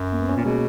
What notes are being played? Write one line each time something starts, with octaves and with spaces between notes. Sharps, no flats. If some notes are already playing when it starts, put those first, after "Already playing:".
Already playing: F#2
A#3
B3
C#4
A#2 A#3
B2 G#3